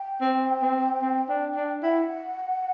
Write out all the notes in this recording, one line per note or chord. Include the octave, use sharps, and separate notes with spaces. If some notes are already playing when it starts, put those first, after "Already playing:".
Already playing: G5
C4
C4
C4
D4
D4
E4 F#5 G5